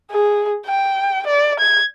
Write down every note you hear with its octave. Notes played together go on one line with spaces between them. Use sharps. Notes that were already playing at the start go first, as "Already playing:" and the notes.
G#4
G5
D5
G#6